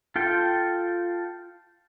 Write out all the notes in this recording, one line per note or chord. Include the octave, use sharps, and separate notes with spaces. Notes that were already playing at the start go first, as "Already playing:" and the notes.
F4 A4 G5